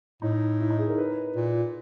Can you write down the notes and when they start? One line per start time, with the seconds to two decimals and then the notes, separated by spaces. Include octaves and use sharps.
0.22 A2 D#4
0.60 E4
0.70 D#4
0.79 G#4
0.88 A#4
0.98 B4
1.36 A#2